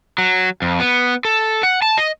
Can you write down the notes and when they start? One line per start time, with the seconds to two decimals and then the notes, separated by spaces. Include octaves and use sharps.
0.18 F#3
0.62 F2
0.80 B3
1.25 A4
1.63 F#5
1.82 A5
1.98 D#5